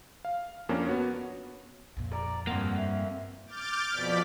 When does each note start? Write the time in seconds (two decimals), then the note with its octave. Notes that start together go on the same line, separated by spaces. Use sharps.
0.25 F5
0.69 F2 A#3 C#4 D4
0.87 B3 F#4 C#5
1.97 F2 A#2
2.13 D5 A#5
2.47 G2 F3 A#3 C4 F#5
2.77 E5
3.47 D6 F6 G6 A6 D7
3.90 F2 B2 D5 B6